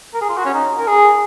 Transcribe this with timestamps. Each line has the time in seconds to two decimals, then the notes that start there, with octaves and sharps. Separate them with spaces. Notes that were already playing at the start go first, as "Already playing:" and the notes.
0.14 A#4
0.21 G#4
0.29 F4
0.37 F#4
0.45 C#4
0.54 D#4
0.78 A#4
0.87 G#4